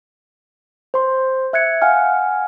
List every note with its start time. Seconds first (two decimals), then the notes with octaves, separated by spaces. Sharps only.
0.94 C5 C6
1.53 E5 F#6 G#6 C#7
1.82 F5 F#5 G#5 F6